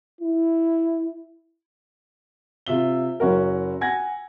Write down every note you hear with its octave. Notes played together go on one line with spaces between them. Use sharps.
E4
C3 F4 E5 G7
F#1 C#4 F#4 A#4
F#5 G#5 G#6 A#6